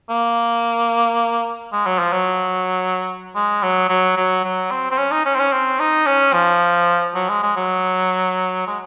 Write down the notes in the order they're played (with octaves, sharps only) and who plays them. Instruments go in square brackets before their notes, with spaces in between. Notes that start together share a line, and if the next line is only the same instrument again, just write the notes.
[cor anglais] A#3
G#3
F#3
F3
F#3
G#3
F#3
F#3
F#3
F#3
C4
C4
C#4
D#4
C#4
C4
C#4
C4
D#4
C#4
F3
F#3
G#3
G#3
F#3
G#3